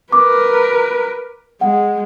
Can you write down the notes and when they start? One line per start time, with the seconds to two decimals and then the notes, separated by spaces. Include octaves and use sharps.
0.12 A#4 B4 D6
1.61 G#3 F#5